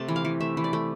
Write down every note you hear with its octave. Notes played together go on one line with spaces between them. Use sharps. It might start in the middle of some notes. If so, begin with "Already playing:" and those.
Already playing: C3 A3 A5
E3
F5
E3
A3 E5
E3
D5
A3